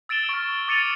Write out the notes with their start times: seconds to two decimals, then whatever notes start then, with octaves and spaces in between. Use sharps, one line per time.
0.09 E6 A6 D7 E7 G7
0.29 C#6 F6
0.68 D6 A6 C#7 D#7 F7 F#7